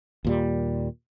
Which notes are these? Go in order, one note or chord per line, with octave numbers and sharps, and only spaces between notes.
D#2 A#2 G3